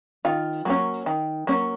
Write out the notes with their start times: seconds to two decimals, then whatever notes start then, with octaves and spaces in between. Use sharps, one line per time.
0.25 D#3 F4
0.65 F#3 A#3 C#4
1.06 D#3
1.47 F#3 A#3 C#4